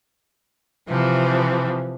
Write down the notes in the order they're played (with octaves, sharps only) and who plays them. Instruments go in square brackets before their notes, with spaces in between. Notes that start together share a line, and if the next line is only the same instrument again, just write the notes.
[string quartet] C3 E3 F3